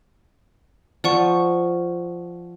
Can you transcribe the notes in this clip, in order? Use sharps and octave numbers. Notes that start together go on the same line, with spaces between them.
F3 D5 F#5 C#6